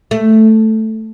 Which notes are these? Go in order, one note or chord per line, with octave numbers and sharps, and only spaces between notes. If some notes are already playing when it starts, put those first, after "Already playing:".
A3